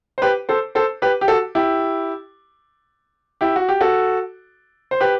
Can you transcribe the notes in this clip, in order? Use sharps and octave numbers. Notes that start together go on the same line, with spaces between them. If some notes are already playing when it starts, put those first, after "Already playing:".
C5
G4 B4
A4 C5
A4 C5
G4 B4
G4
F#4 A4
E4 G4
E4 G4
F#4
G4
F#4 A4
C5
G4 B4